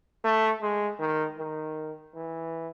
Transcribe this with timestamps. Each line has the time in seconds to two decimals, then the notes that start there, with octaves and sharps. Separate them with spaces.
0.24 A3
0.62 G#3
1.00 D#3
1.39 D#3
2.15 E3